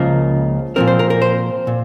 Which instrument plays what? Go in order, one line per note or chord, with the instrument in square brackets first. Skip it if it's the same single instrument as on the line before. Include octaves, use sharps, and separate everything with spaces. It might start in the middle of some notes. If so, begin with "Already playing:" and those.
Already playing: [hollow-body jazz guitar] C#2 C#3 F3 A#3 A#4
A#2 F3 C4 A#4
C5
A#4
A#4
C5
A#2